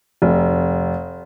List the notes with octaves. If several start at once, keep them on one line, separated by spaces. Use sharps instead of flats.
F1